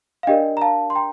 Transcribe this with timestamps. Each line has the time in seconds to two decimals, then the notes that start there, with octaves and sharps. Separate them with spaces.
0.23 F5
0.27 D4 G4 A#4 D5 D#5 G5
0.57 A#5
0.61 F5 A5
0.90 C6
0.95 G5 A#5